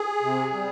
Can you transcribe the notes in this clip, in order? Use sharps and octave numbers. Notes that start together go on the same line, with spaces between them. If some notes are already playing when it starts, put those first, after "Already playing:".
Already playing: G#4
C3
G3